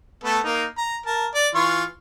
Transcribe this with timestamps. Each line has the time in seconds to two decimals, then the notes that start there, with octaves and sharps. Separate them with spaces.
0.24 A3 B3 A4
0.44 A#3 D#4
0.77 A#5
1.06 A#4 A5
1.35 D5
1.55 E3 F4 C#6